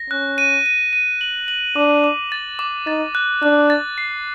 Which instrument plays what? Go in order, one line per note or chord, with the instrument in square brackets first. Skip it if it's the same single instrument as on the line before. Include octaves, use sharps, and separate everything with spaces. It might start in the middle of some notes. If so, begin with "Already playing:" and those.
Already playing: [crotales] A#6
[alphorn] C#4 [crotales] F#6
[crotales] D#7
D#7
D#7
F#7
F#7
[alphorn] D4 [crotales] D6
[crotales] D6
A6
D6
[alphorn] D#4 [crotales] A6
[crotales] F#6
[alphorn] D4 [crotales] F#6
[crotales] A6
C7